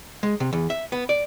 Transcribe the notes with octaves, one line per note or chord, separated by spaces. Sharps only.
G#3
C3
E2
E5
B3
D5